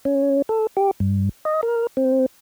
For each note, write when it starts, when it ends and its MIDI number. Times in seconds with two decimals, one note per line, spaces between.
0.05 0.42 61
0.49 0.67 69
0.77 0.91 67
1.00 1.29 43
1.45 1.61 75
1.63 1.87 70
1.97 2.26 60